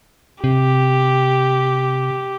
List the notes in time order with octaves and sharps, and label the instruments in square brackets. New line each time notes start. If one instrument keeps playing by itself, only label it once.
[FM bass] C3 [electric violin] G4